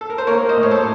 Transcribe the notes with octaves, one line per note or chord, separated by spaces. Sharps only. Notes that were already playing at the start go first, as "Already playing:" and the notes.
A4
A#4
C5
A#3 A#4 C#5
C5 D#5
A2
C#5
A4 C5